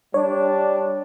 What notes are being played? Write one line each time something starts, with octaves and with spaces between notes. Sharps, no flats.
G3 D4 C#5